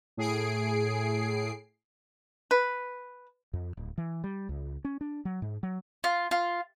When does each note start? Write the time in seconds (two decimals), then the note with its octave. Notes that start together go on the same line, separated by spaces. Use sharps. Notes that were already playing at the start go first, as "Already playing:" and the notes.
0.17 A2 G#4 C7 D7
2.51 B4
3.53 F2
3.77 D1
3.98 E3
4.24 G3
4.49 C#2
4.85 C#4
5.01 D4
5.25 F#3
5.42 G#2
5.63 F#3
6.04 F4
6.31 F4